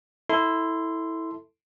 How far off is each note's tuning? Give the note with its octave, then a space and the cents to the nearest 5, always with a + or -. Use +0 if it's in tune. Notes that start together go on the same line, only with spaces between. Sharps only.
E4 -15 A4 +10 C6 -10